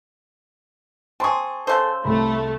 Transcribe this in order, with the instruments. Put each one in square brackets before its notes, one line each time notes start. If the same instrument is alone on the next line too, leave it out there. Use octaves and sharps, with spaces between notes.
[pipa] C4 G#4 [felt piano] A5 C6 C#6
[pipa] C#3 C5 [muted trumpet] A4
[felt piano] C2 [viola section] A3 [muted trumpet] B5